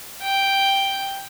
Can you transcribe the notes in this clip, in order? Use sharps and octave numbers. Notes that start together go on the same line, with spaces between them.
G5